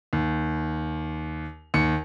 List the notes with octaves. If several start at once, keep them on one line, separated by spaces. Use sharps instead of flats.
D#2
D#2 C#7